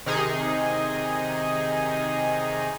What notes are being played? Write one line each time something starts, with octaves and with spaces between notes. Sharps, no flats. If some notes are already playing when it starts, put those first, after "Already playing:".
C3 D#3 D#4 G#4